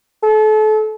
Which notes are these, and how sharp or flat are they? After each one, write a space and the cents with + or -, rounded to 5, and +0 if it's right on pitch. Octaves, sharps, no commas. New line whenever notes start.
A4 -35